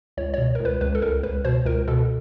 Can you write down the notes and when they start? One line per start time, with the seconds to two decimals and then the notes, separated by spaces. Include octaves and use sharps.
0.17 C#2 C#5
0.34 C#5
0.38 B2
0.55 A#4
0.60 C#2 B4
0.81 C#2 B4
0.95 A4
1.02 C#2 A#4
1.23 C#2 B4
1.45 B2 C5
1.65 C#2 A#4
1.88 B2 A4